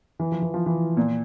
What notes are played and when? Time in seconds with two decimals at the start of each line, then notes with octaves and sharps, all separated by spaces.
0.19 E3
0.32 F3
0.42 E3
0.54 F3
0.66 E3
0.97 A#2